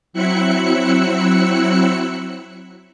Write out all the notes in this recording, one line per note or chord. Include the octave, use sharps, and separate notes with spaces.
F#3 C4 E4 E5 F#6 C#7